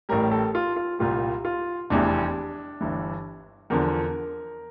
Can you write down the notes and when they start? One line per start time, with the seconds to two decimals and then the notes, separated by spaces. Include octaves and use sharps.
0.09 A1 A2 G3 A#4
0.31 A4
0.55 F4
0.76 F4
0.99 C2 A#2 G3 F4
1.45 F4
1.90 F1 E2 E3 G3 D4
2.81 G1 G2 E3
3.70 E2 D3 F3 A#4